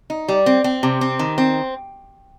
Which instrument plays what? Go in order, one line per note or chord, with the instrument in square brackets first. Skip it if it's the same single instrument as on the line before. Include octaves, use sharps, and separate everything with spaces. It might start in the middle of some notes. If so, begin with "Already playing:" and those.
[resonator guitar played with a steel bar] D#4
G3
C4
C4
C3
C4
D#3
C4